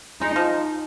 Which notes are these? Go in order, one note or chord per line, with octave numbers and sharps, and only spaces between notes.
G#3 D#4
F3